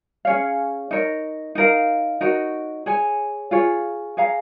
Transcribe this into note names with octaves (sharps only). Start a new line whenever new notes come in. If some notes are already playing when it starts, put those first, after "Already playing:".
C#4 G#4 C#5 F5
D#4 A#4 C#5
D#4 A#4 F5
D#4 F#4 A#4 C#5
G#4 C#5 G#5
F4 G#4 C#5
G#4 C#5 F5 A#5